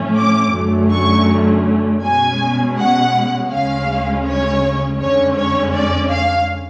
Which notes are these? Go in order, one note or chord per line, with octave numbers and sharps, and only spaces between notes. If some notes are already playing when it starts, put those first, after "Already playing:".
Already playing: A2 F3 A3 C#4
D6
F#2 D3 F#3 A3 C#4
C#6
B2 G#3 C#4 G#5
F#5
D2 C#3 G#3 C#4 F5
C#5
F2 D3 G#3 C#4 C#5
C#5
D5
F5